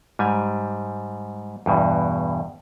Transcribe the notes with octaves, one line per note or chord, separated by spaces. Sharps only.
G#2 G3 G#5
E2 G2 B2